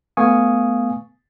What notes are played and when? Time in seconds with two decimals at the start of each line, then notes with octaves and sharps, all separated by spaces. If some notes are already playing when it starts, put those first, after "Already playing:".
0.17 A3 B3 F5 G#5 C#6 D#6